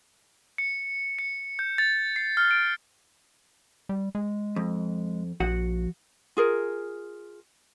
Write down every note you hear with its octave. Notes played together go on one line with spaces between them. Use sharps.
C#7
C#7
G6
A6
C7
F6
D7
G3
G#3
F2
A#1 F3 F#4 F#5
F4 G#4 A#4